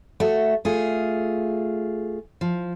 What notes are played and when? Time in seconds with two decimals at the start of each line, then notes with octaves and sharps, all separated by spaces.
0.20 A3 F#4
0.65 A3 F4 G#4
2.41 F3